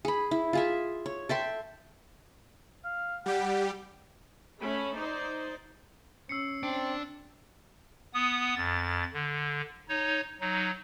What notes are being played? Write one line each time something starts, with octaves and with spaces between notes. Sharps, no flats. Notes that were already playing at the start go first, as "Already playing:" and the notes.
G#4 B5
E4
F4 G#4 E5
C#5
A4 E5 G5 C6
F5
G3 G4 F#5
A3 C#4 B5
D#4 C5 D5
C#4 E6 C7 C#7
C4 D4 D7
B3 D#6
F2 A6
D3
D#4 C#5
F#3 D#4